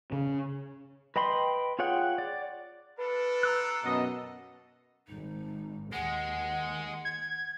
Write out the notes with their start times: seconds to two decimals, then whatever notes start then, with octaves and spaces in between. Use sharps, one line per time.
0.12 C#3
1.16 B4 D#5 G5 B5 C6
1.79 F4 G#4 C#5 F#5 G5
2.18 D5
2.98 D4 F4 A4 B4
3.43 A#5 E6 F#6
3.84 F#2 B2 B3 D#5
5.08 G#1 D#4
5.93 D#2 G#3 F#5
7.05 G#6